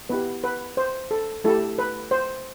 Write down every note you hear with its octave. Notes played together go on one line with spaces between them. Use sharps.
B3 E4 G4 B4
B4
C5
A4
A3 E4 G4 A4
B4
C5